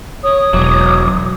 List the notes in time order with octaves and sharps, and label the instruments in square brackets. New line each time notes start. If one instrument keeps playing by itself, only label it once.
[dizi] C#5 [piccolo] D#6
[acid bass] E1 [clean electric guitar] F#3 [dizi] D6